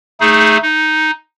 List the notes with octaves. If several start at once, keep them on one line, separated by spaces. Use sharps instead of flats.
A3 D#4 G#4
D#4